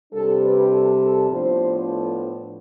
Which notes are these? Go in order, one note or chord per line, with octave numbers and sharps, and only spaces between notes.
C3 G3 D4 A4
B4
A4
A4
A2 F3 B3 D4 C5
A4